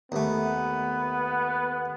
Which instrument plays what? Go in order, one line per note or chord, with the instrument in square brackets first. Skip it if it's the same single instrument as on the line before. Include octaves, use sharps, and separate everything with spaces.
[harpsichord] D#2 A3 [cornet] B3